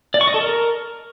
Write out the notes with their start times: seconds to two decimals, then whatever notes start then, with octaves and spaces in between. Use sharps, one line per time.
0.14 D5
0.21 C#6
0.28 D#5
0.34 A4
0.41 A#4